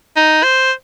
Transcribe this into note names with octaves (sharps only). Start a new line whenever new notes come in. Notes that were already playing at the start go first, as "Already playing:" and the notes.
D#4
C5